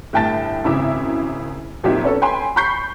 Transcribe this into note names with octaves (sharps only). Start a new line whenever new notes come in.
G1 A2 G5 A5 A6
G#1 F#2 C#3 E4 E5 D6
F2 A#2 F#3 D#4 G4 E5
B3 C#4 A4
C#5 G5 G#5 B5 C6
B5 C#6 G6 B6 C7